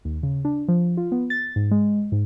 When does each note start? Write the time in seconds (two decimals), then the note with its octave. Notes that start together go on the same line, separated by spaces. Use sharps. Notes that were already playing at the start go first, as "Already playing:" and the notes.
0.05 D#2
0.23 C#3
0.45 D4
0.68 F3
0.97 F4
1.12 B3
1.30 A6
1.56 G#2
1.71 G#3
2.12 G#2